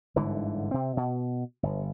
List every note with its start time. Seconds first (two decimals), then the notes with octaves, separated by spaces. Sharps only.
0.16 G1 G#2 D3 E3
0.71 C3 C4
0.97 B2
1.63 G1